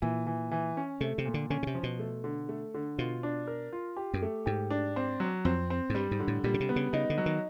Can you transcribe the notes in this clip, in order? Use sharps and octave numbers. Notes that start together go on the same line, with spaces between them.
A#2 E3
E3
E3
C#4
C3 A3
C3
A#2
D3
D3 C#4
C#3
C3
F3
B2
A3
D3
A3
D3
B2 F4
D4
A#4
F4
G4
F#2
A3
G#2 G4
D4
C4
F#3
F2 C4
C4
G#2
G2 G3
G#2
D3
A2
A#2 G3
C#3
C3
B3
C#3
C#3 D#4
D3
F#3
D#3